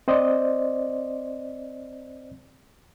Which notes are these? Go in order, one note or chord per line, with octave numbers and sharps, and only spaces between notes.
C4 C5 D5 D#5